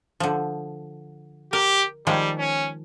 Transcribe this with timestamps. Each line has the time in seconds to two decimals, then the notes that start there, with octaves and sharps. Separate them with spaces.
0.20 D3 F3
1.53 G4 A#4
2.07 D#3 F3 G3 G#3
2.38 C#4